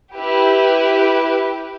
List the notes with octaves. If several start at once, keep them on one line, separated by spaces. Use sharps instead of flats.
E4 G4 B4